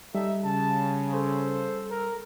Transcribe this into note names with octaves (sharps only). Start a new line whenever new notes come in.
G3 D#4 A4 E5
C#3 A5
A4 C5
A#4